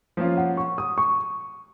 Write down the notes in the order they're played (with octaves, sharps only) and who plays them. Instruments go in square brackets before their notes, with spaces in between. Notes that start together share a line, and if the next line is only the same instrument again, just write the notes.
[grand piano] F3 A#3 C#4 F4
[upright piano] F#5
C#6
D#6
C#6